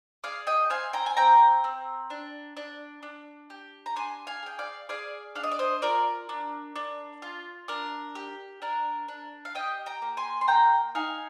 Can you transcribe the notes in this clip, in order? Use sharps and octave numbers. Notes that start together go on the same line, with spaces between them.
G#4 D5 F5
D#5 G5
C4 F5 G#5
G5 A#5
G#5
C4 G5 A#5
C4
D4
D4
D4
G4
A#5
D4 G#5 C6
F5 G#5
G#4 G5
D5 F5
G#4 D5 F5
D4 F5
D#5
D5
C5 D#5
F4 A#4 D5
D4
D4
F4
D4 A#4
G4
D4 A#4
D4
F5
G4 D#5 G5
G5 A#5
A#3
G#5 C6
C6
A#3 G5 A#5
D#4 F5 G#5